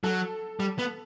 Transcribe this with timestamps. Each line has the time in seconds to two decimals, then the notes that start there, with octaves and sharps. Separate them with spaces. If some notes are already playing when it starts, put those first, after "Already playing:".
0.04 F#3 A4
0.60 G3
0.79 B3